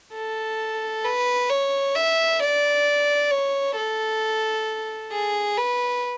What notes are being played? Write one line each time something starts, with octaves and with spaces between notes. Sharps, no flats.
A4
B4
C#5
E5
D5
C#5
A4
G#4
B4